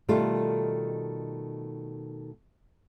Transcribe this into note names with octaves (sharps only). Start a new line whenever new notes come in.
B2 D#3 G3 A3 F4 A4